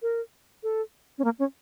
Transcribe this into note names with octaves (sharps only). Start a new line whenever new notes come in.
A#4
A4
C#4
A#3
C#4